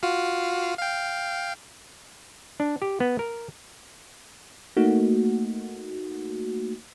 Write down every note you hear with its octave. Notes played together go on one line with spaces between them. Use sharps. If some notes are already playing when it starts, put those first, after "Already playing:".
F4 F#4 F5
F5 G5
D4
G4
B3
A#4
A3 A#3 D#4 F#4